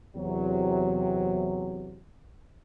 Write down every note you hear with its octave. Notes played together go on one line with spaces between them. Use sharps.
E2 C3 F#3